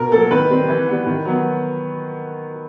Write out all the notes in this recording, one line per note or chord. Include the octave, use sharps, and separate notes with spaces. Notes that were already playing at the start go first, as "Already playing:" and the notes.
Already playing: B2 A#4
F#3 A#3 A4
D#3 B4
G3 C4
E3
G3 B3
D#3
F#3 B3